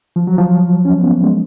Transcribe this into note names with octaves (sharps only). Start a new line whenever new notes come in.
F3
F#3
F3
C#4
B3
A#3
G#3